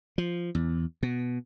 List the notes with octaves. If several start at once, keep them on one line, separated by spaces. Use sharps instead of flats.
F3
E2
B2